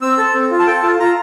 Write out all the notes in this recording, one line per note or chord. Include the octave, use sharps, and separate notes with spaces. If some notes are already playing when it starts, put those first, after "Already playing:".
C4 E6
A4
C4
F4
A5
A4 G5
F4 A5
F4 A#5